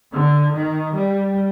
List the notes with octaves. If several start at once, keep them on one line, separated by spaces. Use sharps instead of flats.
D3
D#3
G3